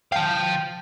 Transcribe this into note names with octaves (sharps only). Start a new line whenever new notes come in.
F5 G5 A5